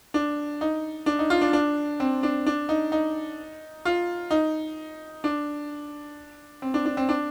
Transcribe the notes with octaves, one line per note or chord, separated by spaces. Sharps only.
D4
D#4
D4
D#4
F4
D4
D4
C4
D4
D4
D#4
D#4
F4
D#4
D4
C4
D4
D4
C4
D4